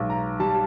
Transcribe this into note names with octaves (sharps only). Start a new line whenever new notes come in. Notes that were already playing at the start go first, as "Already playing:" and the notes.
Already playing: B1 G#3
A#5
G3 A5